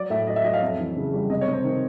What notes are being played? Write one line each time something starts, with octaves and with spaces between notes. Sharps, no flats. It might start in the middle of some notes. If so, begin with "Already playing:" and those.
Already playing: F#3 D5
A2 E5
F#3 D#5
E5
F#3 D#5
F5
F2 E5
E3
C#3
G3
C3 D#5
C#5
C3
C5
D#3